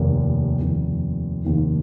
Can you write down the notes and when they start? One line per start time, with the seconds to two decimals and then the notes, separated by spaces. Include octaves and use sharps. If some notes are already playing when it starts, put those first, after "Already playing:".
Already playing: F1 D#2 D#3
0.61 F1 D#2 D#3
1.45 F1 D#2 D#3